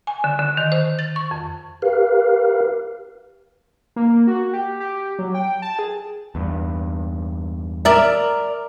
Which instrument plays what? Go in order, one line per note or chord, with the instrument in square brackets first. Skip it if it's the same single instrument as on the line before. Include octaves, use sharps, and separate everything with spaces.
[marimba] G#5
D3
D3
D#3
C5
A6
C#6
F2
[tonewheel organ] G4 A#4 B4 F5
[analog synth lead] A#3
F#4
G4
G4
F#3
G5
A5
G#4
[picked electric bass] E2 G2
[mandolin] A#4 [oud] D5 E5